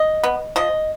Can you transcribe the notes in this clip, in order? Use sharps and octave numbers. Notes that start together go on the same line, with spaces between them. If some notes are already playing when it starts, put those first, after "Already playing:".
Already playing: D#5
B3
F3 D#5